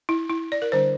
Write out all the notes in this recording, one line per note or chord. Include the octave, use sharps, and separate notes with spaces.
E4
E4
D5
A#4
D3 G3 D4 C5